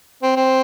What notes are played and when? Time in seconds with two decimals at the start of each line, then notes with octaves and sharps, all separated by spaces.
0.23 C4
0.36 C4